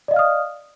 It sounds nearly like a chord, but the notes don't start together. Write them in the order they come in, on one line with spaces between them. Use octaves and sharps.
D5 D#5 F5 F6 D#6